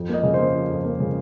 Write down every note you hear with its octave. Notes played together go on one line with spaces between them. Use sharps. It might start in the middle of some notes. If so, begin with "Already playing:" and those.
Already playing: F2
A#3 D#5
C#3
A#3 C5
F3
F2
A#3
C#3